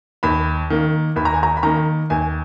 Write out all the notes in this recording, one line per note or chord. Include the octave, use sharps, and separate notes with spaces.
D#2 B5
D#3 A#3
D#2 B5
A#5
G#5
A#5
B5
D#3 A#3 A#5
D#2 G#5